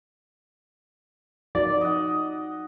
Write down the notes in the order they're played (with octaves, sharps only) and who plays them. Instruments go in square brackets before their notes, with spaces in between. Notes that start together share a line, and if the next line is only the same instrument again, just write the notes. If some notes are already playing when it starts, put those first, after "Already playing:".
[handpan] F3 D#4 F#4 [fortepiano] D5
[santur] D#5 F#5